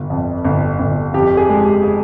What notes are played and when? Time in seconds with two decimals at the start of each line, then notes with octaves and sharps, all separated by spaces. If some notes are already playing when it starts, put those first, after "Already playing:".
Already playing: G1 F4
0.10 F2
0.44 G1
0.79 G1
1.14 F2 G4
1.37 G#4
1.49 G#3
1.61 G4
1.84 G#4